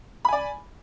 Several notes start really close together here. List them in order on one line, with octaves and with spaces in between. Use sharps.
B5 G#5 D5